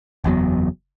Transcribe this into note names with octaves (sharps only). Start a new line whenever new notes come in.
F#1 E2 F#3 B3